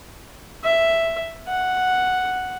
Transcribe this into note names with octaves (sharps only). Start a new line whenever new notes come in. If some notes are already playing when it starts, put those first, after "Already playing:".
E5
F#5